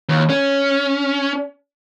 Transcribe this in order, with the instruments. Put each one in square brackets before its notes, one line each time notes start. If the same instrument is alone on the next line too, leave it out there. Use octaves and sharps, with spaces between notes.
[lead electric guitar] D#2
C#4